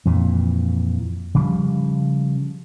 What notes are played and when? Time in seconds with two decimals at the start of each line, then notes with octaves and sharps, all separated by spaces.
0.05 F2 A#2 E3
1.35 C#3 F3 G3